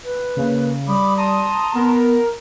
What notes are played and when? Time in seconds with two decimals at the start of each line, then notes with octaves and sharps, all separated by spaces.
0.03 B4
0.36 C#3 A#3
0.88 G3 B5 D6 D#6
1.17 A5 A#5 C6 D#6
1.75 B3 A#4